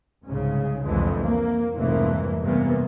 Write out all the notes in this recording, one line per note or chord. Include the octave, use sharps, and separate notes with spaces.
C2 G#2 C#3
C2 F2 D3 E3 G#3
A#3
F1 C2 F2 G#2 E3 A#3
G2 C3 E3 A#3 B3